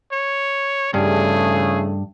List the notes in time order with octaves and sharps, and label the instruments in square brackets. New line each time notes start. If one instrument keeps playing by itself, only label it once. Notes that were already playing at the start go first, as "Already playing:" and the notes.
[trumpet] C#5
[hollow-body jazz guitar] G2 [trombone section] C#3 E3 A3 [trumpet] G#4